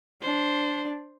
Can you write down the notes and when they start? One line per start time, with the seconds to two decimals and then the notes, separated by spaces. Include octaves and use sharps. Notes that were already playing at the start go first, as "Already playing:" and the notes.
0.22 D4 C5